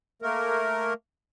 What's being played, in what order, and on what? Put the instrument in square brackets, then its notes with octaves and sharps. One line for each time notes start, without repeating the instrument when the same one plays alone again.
[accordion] A3 A#3 A#4